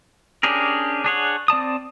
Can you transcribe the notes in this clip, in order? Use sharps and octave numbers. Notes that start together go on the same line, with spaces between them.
C#4 D4 G4 G#4 A#4
D4 G#4 C#5 F#5
C4 D5 A5 D#6